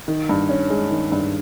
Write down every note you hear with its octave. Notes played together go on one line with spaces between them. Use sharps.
D#3
G2
C#4
G#3
D#3
G2